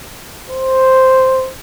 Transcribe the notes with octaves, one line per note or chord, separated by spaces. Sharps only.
C5